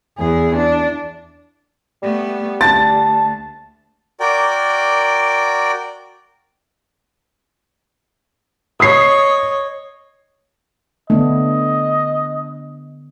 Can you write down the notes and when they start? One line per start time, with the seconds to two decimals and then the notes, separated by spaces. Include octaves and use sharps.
0.18 E2 G#4
0.56 D4
2.02 G3 A3 B3
2.61 D2 A5 A6
4.20 F#4 A#4 D5 G5 D6
8.80 C#5 D#5 D#6 C7
11.10 D3 A3 B3 D4 D#5